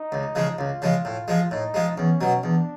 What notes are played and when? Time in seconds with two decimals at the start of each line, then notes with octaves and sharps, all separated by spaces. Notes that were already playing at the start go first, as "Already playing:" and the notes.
Already playing: D#4
0.12 C#2
0.35 C#3 F3 G#3
0.59 C#2 F4
0.82 C#3 F3 G#3
1.05 A2
1.28 F3 G#3
1.51 A2 D#4
1.74 F3 G#3
1.97 E2 C#4
2.21 B2 F#3
2.43 E2 D4